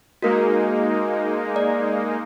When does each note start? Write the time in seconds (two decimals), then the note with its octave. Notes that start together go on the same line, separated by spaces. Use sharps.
0.22 G#3 A#3 D#4 F#4 A#4
1.56 D5